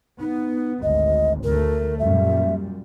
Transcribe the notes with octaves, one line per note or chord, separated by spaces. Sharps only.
B3 D#4
G#1 D2 D#5
D2 A3 A#4
F#2 A#2 G3 E5